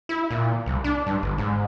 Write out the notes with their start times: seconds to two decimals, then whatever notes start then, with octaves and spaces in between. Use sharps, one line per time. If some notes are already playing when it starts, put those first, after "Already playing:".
0.09 E4
0.31 A#2
0.66 C2
0.84 D4
1.07 G2
1.22 G1
1.38 G#2